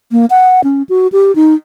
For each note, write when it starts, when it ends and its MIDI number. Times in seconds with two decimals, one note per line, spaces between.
0.12 0.26 58
0.30 0.61 78
0.64 0.83 61
0.89 1.07 66
1.12 1.34 67
1.36 1.55 63